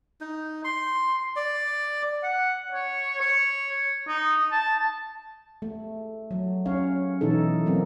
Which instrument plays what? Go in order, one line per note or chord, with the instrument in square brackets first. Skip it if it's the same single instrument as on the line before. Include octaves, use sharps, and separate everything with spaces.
[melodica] D#4
C6
D5
[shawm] F#5
C#5
C#5
D#4
A5
[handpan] A3
F#3
C#4 C#5 F5
B2 E3 D#4 A4
F#3 A#3 C4